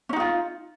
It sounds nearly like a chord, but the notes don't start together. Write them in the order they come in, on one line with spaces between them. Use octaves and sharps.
C#4 D#4 F#4 F4